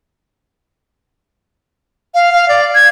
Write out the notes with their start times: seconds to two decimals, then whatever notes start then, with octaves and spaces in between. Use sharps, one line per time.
2.15 F5
2.33 F5
2.48 D5
2.75 G#6